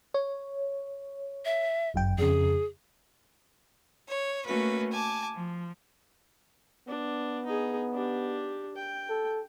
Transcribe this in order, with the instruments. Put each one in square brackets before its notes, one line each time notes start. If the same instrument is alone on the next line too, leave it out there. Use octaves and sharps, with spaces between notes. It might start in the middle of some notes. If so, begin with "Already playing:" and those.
[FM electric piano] C#5
[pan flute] E5
[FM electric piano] G1 F#2 G5
[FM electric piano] F2 C#3 [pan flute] G#4
[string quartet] C#5
A3 A#3 C#4 F#4 B4
G#5 A5 D6
F3
[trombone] B3 [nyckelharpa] D4
[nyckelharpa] D#4 G#4
D4 G4
G5
[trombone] A4